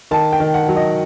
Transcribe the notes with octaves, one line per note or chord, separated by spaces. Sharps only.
D#3 A5
G5
D#3
F#5
F#3
D#5